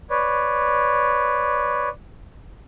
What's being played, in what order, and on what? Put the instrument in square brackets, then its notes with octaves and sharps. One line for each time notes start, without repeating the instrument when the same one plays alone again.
[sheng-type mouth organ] B4 C#5 D5